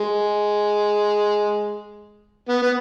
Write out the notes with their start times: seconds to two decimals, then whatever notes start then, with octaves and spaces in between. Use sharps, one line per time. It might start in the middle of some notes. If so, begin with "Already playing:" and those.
Already playing: G#3
2.49 B3
2.63 B3